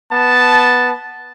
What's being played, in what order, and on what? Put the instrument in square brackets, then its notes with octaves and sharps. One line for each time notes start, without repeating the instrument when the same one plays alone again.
[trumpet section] B3 A5